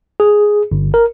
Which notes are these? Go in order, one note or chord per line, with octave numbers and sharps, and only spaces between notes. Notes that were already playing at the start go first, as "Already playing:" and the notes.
G#4
G1
A#4